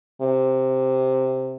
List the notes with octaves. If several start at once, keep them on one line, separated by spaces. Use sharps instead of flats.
C3